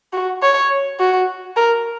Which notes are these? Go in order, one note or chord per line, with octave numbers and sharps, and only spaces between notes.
F#4
C#5
F#4
A#4